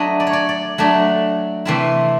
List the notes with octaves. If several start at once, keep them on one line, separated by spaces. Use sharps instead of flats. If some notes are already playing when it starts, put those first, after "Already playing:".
Already playing: F#3 A3 D4 D#5
D5
C#5
D5
D5
F#3 A3 D4
C3 E3 A3 C4 E4